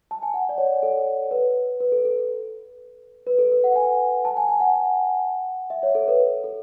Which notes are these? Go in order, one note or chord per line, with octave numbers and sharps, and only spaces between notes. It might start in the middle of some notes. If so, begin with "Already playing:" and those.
A5
G#5
F#5
D5
C#5
A4
B4
B4
A4
A4
B4
A4
B4
F#5
G#5
A5
G#5
G#5
F#5
E5
C#5
A4
B4
A4